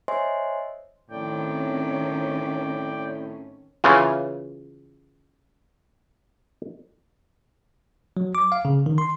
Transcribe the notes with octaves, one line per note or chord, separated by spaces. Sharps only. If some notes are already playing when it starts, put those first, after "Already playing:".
C5 C#5 D#5 E5 G#5 C6
A2 D#3 C4 C#4 D5 G5
C#3 E3 F4
F#3
D6
F5
C#3
D#3
C6